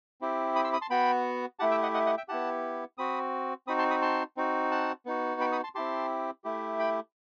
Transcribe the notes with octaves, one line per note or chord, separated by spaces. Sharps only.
C4 E4 G4
B5 D#6
C6 E6
B5 D#6
A5 C6
B3 F#4 G5 B5
A3 E4 G4 F#5 A5
E5 G5
D#5 F#5
D#5 F#5
D#5 F#5
E5 G5
B3 E4 G4 F#5 A5
C4 F#4 B5 D#6
C4 D#4 F#4 B5 D#6
A5 C6
B5 D#6
A5 C6
C4 D#4 F#4
F#5 A5
B3 D#4 F#4
G5 B5
B5 D#6
A5 C6
C4 E4 G4 A5 C6
A3 E4 G4
G5 B5